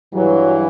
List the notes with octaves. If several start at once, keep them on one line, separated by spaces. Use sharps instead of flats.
G2 E3 F#3